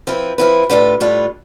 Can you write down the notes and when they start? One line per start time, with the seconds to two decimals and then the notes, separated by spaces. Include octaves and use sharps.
0.07 F3 C4 E4 B4
0.38 F3 C4 E4 B4
0.70 A2 G3 D4 F4 B4
1.00 A2 G3 D4 F4 B4